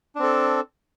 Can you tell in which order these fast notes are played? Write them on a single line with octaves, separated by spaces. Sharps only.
D4 C4 A4